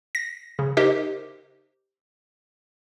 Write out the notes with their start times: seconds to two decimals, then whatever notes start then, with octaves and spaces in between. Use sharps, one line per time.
0.15 A#6
0.59 C#3
0.77 D#4 G4 A#4 C5 D#5